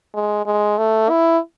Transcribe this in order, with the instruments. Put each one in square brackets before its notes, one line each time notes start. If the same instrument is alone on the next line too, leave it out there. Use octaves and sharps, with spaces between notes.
[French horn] G#3
G#3
A3
E4